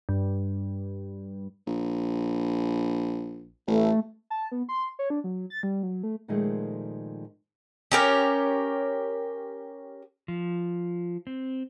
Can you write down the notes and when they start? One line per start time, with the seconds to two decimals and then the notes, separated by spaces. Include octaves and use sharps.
0.09 G2
1.67 A#1
3.67 A1 A3
4.30 A5
4.52 B3
4.69 C6
4.99 C#5
5.10 D4
5.24 F#3
5.50 A6
5.63 G3
5.83 F#3
6.03 A3
6.28 A#2 D#3 F3 G#3 A3
7.92 C#4 G4 A#4
10.28 F3
11.27 C4